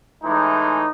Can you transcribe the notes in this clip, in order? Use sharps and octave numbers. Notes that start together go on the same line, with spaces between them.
A2 E3 G#3 D#4